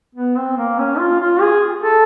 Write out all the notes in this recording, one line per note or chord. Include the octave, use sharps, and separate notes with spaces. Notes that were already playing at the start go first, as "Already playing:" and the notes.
B3
C4
A#3
C#4
F4
F4
G#4
A4